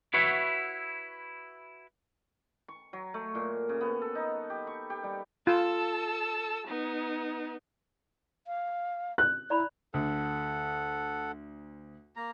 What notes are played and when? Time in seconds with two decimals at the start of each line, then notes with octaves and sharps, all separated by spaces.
0.13 E4 F#4 B4 C#5 E5 F#5
2.68 C#6
2.93 F#3
3.14 A3
3.35 A#2
3.69 C#3
3.81 B3
4.02 A4
4.15 D#4
4.50 G4
4.67 C#6
4.90 G4
5.04 G3
5.47 F4 A4 A5 E6
6.67 B3 D#4
8.47 F5
9.18 F#6
9.50 E4 D5 A#5 B5
9.94 D2 A4 F#5
12.16 A#3 A#5